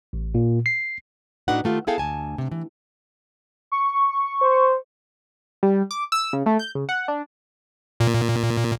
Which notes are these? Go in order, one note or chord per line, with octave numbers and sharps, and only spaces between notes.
A1
A#2
C7
A2 D4 D#4 F#4 B4 F#5
D#3 A3 F4 G4
B3 E4 G#4 A4 F5 G5
D2 G#5 A5
C3
E3
C#6
C5
G3
D6
E6
C#3
A3
G6
C#3
F#5
D4
A#2